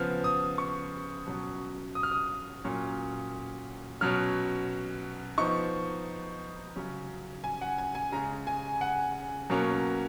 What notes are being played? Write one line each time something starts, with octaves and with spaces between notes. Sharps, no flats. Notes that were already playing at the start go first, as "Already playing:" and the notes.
Already playing: C#3 F3 B3 F6
D#6
C#6
B2 F#3 C#4
D#6
F6
D#6
A#2 F#3 C#4
B2 F#3 C#4 F6
F3 B3 D#4 C#6
C#3 F#3 C#4
G#5
F#5
G#5
G#5
C#3 G#3 C#4 A#5
G#5
F#5
B2 F#3 A#3 C#4